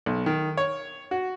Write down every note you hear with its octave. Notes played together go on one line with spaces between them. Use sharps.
B1
D#3
C#5
F#4